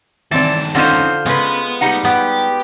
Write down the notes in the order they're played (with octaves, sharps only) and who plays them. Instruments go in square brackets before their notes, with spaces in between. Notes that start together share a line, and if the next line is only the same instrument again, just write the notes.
[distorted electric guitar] G2 D#3 [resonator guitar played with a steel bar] E3 C4 D5 [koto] A5
[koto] D3 F4 C5 [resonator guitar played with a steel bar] C4 C#4 D#4
[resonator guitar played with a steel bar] C#3 B4 [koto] G#3 [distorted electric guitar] B3
[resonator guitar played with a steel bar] G3 D#4 F#5
[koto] B3 [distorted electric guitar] G4